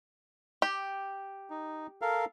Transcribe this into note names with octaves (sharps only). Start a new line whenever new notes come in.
G4
D#4
A4 A#4 F5